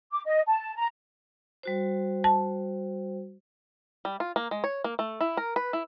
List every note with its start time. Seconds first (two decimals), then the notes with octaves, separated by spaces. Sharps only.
0.12 D6
0.26 D#5
0.48 A5
0.76 A#5
1.63 G3 F#4 C5
2.24 A5
4.05 G3
4.20 F4
4.36 A#3
4.51 G#3
4.64 C#5
4.84 A#3
4.99 A3
5.21 E4
5.37 A#4
5.56 B4
5.73 E4